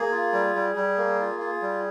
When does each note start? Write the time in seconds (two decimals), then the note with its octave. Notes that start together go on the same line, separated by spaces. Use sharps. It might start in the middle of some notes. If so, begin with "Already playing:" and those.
Already playing: A#3 G#4
0.12 F4
0.33 G3
0.55 G3
0.76 G3
0.98 A#3
1.20 F4
1.40 F4
1.62 G3